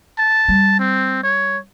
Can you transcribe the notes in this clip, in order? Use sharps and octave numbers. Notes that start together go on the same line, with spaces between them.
A5
G3
C4
C#5